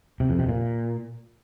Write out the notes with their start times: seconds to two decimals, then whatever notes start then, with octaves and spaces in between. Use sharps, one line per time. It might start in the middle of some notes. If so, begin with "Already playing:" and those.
0.20 C3
0.30 F2
0.39 C3
0.49 A#2